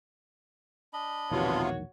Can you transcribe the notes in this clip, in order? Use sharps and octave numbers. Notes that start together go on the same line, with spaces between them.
D4 D#5 B5
E1 A#1 C3 D#3 B3 F4 F#4 C#5